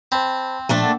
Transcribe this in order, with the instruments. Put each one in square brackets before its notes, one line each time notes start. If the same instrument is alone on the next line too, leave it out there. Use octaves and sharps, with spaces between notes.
[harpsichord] C4 [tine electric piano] C5 A5 B5
[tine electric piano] A#2 F3 [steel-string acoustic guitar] A3 D4 A4
[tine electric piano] A#3 F#5